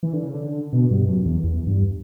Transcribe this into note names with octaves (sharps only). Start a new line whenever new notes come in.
E3
D3
C#3
D3
B2
G2
F#2
E2
E2
G2